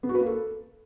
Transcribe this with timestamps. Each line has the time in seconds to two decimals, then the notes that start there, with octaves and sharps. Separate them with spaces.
0.03 B3
0.09 F#4
0.15 B4
0.21 A#3
0.26 A4